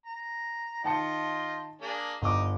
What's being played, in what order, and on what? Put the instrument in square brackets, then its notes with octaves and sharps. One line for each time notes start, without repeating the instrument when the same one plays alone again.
[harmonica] A#5
[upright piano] D#3 A5 C#7 [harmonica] F4 D#5 G5
[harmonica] A#3 D4 G#4
[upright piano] G1 D6 [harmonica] D#4